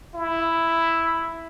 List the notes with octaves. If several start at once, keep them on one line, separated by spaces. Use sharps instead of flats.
E4